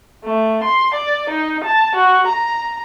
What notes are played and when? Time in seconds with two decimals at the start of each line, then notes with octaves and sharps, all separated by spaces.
0.24 A3
0.64 C6
0.94 D5
1.30 D#4
1.64 A5
1.96 F#4
2.27 A#5